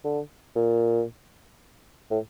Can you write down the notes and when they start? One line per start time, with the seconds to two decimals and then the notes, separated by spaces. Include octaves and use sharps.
0.04 D3
0.56 A#2
2.11 A2